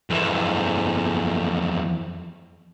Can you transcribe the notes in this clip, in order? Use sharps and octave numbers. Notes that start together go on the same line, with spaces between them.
F2 E3